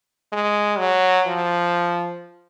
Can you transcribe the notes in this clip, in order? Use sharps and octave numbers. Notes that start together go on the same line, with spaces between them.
G#3
F#3
F3